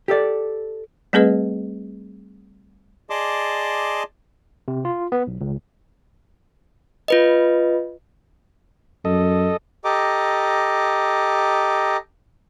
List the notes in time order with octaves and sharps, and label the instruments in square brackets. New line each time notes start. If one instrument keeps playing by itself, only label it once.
[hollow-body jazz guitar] G4 A4 D5
[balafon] G3 A3 C4 G#4 B4 D#5
[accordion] G#4 D5 D#5 A5 C6 D6
[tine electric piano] C3
F4
B3
B1
C#2
[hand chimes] F4 B4 D#5
[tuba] F#2 [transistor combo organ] A4 D#5
[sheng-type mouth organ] G4 A4 D#5 A#5 D6